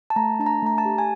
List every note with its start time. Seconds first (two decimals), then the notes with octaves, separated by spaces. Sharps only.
0.10 A5
0.16 A3 A#5
0.39 D4 A5
0.46 A#5
0.62 A3 A#5
0.78 A5
0.85 G4
0.98 G#5